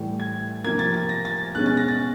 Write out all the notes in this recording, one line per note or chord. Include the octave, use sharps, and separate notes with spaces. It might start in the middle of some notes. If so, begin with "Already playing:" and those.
Already playing: A2 E3 G3
G#6
C3 F3 A#3 G#6
A6
A6
A#6
A6
B2 G#3 C#4 F#6
A6
A#6
A6